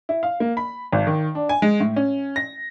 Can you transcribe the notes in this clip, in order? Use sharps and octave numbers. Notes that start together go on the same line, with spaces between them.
E4
F5
A#3
B5
G#1
D#3
D4
G#5
G#3
A2
C#4
A#6